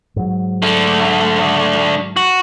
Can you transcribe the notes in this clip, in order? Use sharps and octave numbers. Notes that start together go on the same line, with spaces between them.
G#2 F#3
D3 A3
F#4